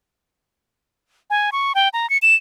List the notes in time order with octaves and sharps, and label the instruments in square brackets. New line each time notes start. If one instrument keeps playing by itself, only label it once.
[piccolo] G#5
C#6
G5
A#5
C#7
E7